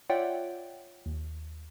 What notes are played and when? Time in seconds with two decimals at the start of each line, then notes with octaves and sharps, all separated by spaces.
0.09 F4 C#5 D5 E5 F#5 G5
1.06 D#2